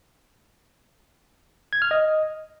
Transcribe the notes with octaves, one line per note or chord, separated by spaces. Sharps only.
G#6
F6
D#5